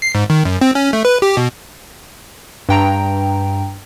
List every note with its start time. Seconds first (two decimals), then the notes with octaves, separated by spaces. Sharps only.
0.02 C7
0.15 G#2
0.30 D#3
0.45 F#2
0.61 C4
0.75 C#4
0.93 A3
1.05 B4
1.22 G4
1.37 B2
2.69 G2 G5 A#5